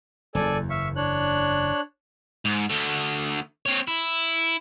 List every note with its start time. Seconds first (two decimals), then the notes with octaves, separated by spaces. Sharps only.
0.35 F#1 E2 A4 D5 G#5
0.70 E5 F5 C#6
0.96 D4 C#5 F#6
2.45 G#2
2.69 D2 A3
3.66 C4 C#5
3.88 E4